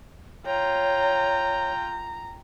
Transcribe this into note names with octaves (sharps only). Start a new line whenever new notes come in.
F4 C#5 G5 A#5